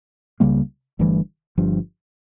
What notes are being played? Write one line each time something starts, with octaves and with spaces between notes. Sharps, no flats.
C#2 C#3 G3 A#3
G1 G2 E3 A3
G1 G2 F3